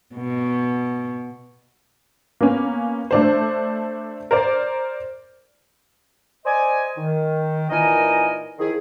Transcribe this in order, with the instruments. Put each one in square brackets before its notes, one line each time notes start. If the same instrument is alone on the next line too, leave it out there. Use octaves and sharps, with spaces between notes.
[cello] B2
[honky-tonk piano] A#3 B3 C#4
A3 D4 C5
A#4 C5 D5
[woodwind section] C5 D5 D#5 G#5
D#3
A#2 E3 D#4 A#4 D#5 G#5
D#3 F3 E4 G#4